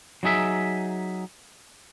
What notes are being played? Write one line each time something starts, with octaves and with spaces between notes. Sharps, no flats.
F#3 D#4 G#4 E5